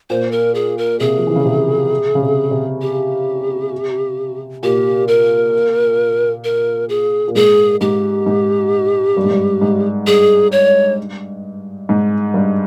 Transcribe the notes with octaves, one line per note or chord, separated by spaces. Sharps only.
A#2 C5
A#4
G#4
A#4
C3 G#4
F3
E3
C#3
C3
C#3
C3
C3
G4
A#2 G4
A#4
A#4
G#4
A#2
G#2 G#4
G#2 G4
G#2
G2
G#2
G2
G#2
G2 G#4
C#5
G#2
G2